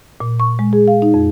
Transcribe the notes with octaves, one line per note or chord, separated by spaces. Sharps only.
A#2
C#6
G#3
G#4
F5
D#4
F2